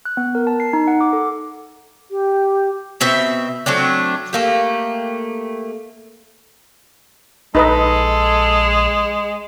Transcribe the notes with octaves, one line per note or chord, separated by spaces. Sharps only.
F#6
B3
A#4
A5
C7
D#4
F#5
D6
A4
G4
B2 C4 E5
F#3 A3 C4 D4
A3 A#3 G4
A#1 G#3 D#4 A4 B4 D#5